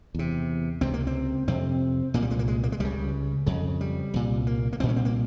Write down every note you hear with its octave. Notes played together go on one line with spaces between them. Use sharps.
E2 C3
C#2 C3 C4
A#3
C4
F2 C3 C4
C2 A#2 A#3
G3
G#3
A#3
G#3
A#3
G#3
C#2 C#3 G3
F2 C#3
G3
C2 A#2
A#3
A#3
C2 A#2 C4
C#4
C4
A#3